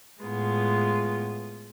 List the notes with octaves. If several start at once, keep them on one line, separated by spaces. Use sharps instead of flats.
A2 G#3 B3 F4